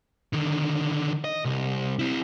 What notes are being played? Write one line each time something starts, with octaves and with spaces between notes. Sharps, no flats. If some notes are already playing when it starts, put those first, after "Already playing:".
D3 D#3
D#5
C2
C4 E4